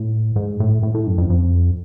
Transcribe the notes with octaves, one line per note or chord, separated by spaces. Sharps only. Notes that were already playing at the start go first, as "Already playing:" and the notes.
Already playing: A2
G#2
A2
A2
A2
F#2
F2
F2